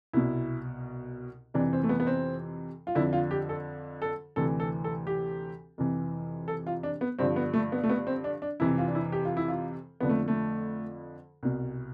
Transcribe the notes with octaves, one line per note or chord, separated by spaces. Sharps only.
C2 B2 E4
F2 C3 E3 D4
C4
A3
B3
B3
C4
F4
F2 D3 F3 E4
F4
G4
A4
A4
D2 C3 E3 A4
A4
A4
G4
F2 C3 E3
A4
F4
D4
B3
G2 D3 F3 C4
B3
A3
B3
A3
B3
C4
D4
D4
F2 C3 E3 E4
F4
D4
E4
G4
F4
E4
F4
F2 D3 F3 B3
A3
A3
C2 B2